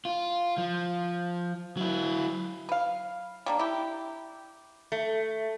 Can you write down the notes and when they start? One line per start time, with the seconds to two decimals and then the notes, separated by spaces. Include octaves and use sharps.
0.05 F4
0.58 F3
1.77 F#3 E4
2.69 B4 F5
3.46 G3 A#3 D4
3.59 E4 G4
4.92 A3